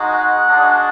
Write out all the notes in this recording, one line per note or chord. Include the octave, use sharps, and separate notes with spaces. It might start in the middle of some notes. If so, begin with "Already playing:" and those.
Already playing: G#3 D#4 F#4
F#5
G#3 D4 F#4